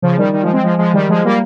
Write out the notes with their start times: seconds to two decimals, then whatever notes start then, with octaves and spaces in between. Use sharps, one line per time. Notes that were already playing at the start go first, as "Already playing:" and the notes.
0.02 C#3 F3
0.18 D#3 G3
0.33 D#3 G3
0.43 F3 G#3
0.53 G#3 C4
0.63 F3 G#3
0.78 F3 G#3
0.93 D#3 G3
1.09 F3 G#3
1.24 G3 A#3